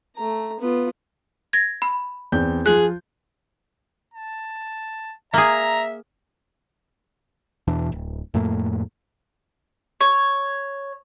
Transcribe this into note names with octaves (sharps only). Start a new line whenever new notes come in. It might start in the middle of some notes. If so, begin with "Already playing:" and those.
A3 A#5
B3 F4
G#6 A#6
B5
E2 C4 G6
F3 F4 G#4 F#6
A5
A#3 G#4 E5 A#5
E2 B2 E3 D4
D1
F2 A2 A3 A#3
C#5